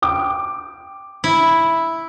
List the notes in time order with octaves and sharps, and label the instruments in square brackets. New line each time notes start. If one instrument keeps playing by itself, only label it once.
[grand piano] G5 D6
[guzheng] E4